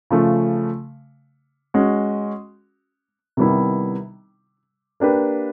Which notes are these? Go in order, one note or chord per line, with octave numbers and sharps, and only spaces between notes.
C#3 F3 A3
G#3 C#4 F#4
C3 D#3 G3 B3 E4
A#3 D4 G4 B4